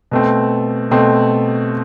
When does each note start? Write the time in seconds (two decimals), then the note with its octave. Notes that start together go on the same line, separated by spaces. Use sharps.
0.11 B2 A3 C4
0.91 B2 A3 C4